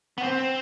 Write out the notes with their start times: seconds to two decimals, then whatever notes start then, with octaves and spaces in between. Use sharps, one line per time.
0.18 B3
0.23 C4